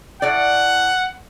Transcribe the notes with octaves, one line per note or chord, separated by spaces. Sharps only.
A2 D5 F#5